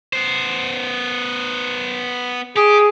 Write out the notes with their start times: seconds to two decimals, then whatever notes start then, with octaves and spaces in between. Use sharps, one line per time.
0.13 B3 C5
2.56 G4 G#4